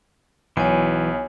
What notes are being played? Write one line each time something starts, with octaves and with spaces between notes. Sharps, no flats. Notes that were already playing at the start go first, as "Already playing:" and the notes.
B1 E3 F#3 C#5 G#5